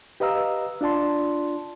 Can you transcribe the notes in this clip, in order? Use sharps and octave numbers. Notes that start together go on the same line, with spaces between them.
G4 B4 D#5 F5 A#5 E6
D4 F4 D5 A5 C6